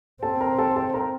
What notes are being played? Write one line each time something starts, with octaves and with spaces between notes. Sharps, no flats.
C4 A4 A5
A#4 A#5
A4 A5
A4 A5
A#4 A#5